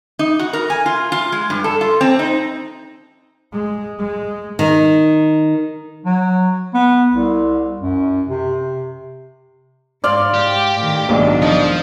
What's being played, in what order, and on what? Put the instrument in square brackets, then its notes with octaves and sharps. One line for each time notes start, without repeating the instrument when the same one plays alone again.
[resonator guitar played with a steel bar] D#4
F#4
A#4
G#5
F4
F4
G#3
G2
A4
F4
C4
D#4
[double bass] G#3
G#3
[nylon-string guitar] D#3
[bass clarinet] F#3
B3
C2
F#2
C3
[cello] G#2 [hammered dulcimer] D5 F5 C6
[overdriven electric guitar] G4
[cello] A2 D#3
[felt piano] B1 G#2 [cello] D#3 D4
[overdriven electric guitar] F3 [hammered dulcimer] D#5